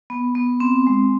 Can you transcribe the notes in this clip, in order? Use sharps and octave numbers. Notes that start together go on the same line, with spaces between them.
B3
B3
C4
G#3